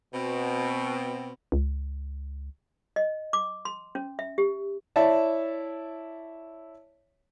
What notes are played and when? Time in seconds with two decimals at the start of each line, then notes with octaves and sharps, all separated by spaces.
0.14 B2 C4
1.52 C#2
2.96 D#5
3.33 D6
3.65 C6
3.95 C#4
4.19 E5
4.38 G4
4.96 E4 C#5 D5 E5 A5